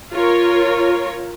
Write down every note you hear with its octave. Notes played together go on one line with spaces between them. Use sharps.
F4 A#4 C#5